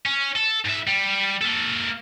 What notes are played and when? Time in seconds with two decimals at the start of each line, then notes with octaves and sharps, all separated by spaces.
0.06 C#4
0.36 A4
0.65 G#2 E5
0.87 G3
1.41 A#3 A4